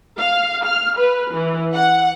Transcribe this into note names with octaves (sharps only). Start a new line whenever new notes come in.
F5
F6
B4
E3
F#5